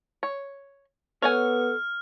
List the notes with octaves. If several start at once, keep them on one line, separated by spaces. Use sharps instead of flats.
C#5
B3 A4 C#5 F#5 G#5 F6